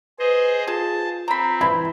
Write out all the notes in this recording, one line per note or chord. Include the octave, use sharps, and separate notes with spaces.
G#4 B4 C5 D#5
F4 G#4 A5
C4 A#5 B5
E3 E4 B5